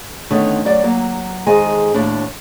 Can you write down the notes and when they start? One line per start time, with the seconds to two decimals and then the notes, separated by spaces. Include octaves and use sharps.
0.30 D3 D#3 A3 B3 C#4
0.65 F#2 D5
0.84 F#3 A#3
1.46 F2 D#3 G#3 G#4 D#5 G#5
1.94 D#2 A2 D4